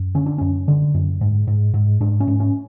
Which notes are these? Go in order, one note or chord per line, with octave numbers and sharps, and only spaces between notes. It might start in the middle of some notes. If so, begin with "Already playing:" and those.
Already playing: F#2
D3 C#4
D4
F#2 C#4
D3
F#2
G#2
G#2
G#2
G#2 D4
C#4
G#2
C#4